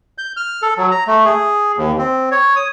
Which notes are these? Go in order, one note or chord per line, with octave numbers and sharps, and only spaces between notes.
G6
F6
A4
F#3
A#5
A3
G#4
D#2
C4
C#5
D#6